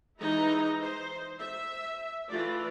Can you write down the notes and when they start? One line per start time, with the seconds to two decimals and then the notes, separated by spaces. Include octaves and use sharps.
0.20 E3 G#3 D#4 E4 D#5 A#5
0.81 C5
1.40 E5
2.29 E3 A3 F4 D5